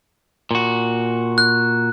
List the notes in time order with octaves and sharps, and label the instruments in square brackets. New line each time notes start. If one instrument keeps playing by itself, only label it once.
[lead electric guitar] A#2 F#4
[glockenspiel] F#6